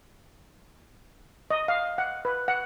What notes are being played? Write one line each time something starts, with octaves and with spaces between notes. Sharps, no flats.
D#5
F5
F#5
B4
F#5